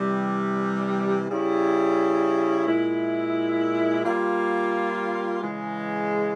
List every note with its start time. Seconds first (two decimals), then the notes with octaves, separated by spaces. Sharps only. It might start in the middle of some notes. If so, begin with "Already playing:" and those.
Already playing: C3 E3 G3
1.29 C#3 G3 C#4 E4
2.67 A#2 G#3 E4
4.03 G3 A#3 F4
5.41 C#3 E3 G#3